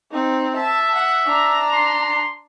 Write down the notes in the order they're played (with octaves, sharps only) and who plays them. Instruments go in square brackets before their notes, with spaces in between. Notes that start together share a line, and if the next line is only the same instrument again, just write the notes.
[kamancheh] C4 D#4
[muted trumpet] E5 [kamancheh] A5
[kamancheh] F#5
D4 A#5
[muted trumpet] C6